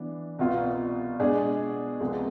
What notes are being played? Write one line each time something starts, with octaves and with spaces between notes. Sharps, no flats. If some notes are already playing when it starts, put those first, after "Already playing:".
Already playing: E3 B3 D4
C2 B2 B3 F4
B2 G#3 D4 G#4
C2 C3 F3 G#3 B3